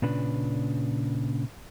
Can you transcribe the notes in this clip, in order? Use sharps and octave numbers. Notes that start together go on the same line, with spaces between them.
A#2 C#3 D4 B4